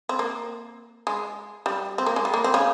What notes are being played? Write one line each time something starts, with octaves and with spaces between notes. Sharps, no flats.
C4
A#3
G#3
G3
C4
A#3
G#3
G3
A#3
C4
C#3 C#4